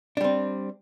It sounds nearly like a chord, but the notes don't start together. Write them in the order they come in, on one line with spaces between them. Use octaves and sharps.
D4 G3 C4